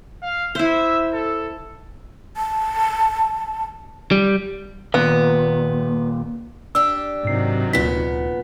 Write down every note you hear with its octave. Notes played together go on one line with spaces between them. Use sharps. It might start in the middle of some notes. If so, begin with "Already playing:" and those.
F5
E4 C5 E5
A4
A5
G3
D#2 A#2 B3
D4 G4 E6
G#2 C3 D#3 F#3 C7
D2 A#2 B3 D#4 B6